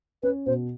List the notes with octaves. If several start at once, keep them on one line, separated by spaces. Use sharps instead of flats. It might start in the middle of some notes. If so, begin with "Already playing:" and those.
C#4 B4
B2 C5